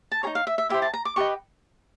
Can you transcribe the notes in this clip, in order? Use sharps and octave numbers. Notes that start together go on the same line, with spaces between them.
A5
D#4 G#4 C#5 A#5
F5
E5
E5
E4 G4 C5 E5
A5
A#5
D6
G4 B4 D#5 C#6